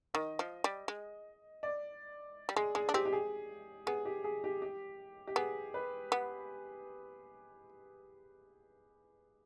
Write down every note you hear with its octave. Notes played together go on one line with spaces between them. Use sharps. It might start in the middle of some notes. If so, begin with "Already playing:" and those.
D#3 D#5
F3
G3
G#3
D5
G3
G#3 G#4
G#3 G#4
D4
C4 G4
G4
G#4
B3 G#4
G4
G#4
G4
G4
G4
B3 G#4
B4
B3